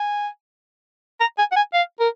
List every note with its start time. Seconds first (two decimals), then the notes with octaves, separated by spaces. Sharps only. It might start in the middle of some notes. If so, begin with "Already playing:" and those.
Already playing: G#5
1.20 A#5
1.38 G#5
1.52 F#5
1.56 G#5
1.74 F5
2.00 A#4